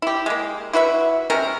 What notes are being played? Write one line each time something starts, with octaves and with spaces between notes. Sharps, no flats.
E4 G4
G#3 A#3
E4 F#4 B4 E5
C3 G#3 C#4 A#4